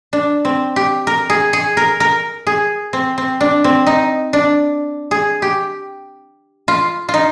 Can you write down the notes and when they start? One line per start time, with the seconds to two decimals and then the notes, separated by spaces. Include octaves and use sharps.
0.13 D4
0.45 C4
0.76 G4
1.07 A#4
1.30 G#4
1.53 G#4
1.77 A#4
2.00 A#4
2.47 G#4
2.93 C4
3.18 C4
3.41 D4
3.64 C4
3.86 D#4
4.33 D4
5.11 G#4
5.42 G4
6.68 F4
7.09 F4
7.14 D#4